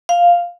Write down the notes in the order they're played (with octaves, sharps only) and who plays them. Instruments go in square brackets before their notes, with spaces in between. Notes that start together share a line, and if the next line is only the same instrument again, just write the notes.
[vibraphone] F5